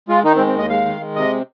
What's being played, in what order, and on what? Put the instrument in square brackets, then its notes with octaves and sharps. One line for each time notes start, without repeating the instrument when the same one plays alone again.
[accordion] G#3 F4
D#3 D#4
C4
G#3
C4
D#2 D#5
G#3 F5
D#3
G#3
C3 D#5